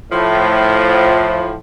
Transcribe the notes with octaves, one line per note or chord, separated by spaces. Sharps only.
A2 F3